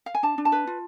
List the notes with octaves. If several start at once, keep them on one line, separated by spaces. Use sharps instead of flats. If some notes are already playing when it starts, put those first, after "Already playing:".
F5
G#5
D4 A5
D4
A5
B4
F4